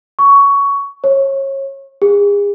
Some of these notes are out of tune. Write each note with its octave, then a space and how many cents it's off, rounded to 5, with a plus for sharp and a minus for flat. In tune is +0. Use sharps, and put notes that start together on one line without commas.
C#6 +15
C#5 -30
G#4 -40